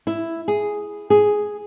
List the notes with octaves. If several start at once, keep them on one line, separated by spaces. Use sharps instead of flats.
E4
G#4
G#4